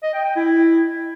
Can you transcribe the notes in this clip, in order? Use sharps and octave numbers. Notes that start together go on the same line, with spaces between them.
D#5
G5
G5
E4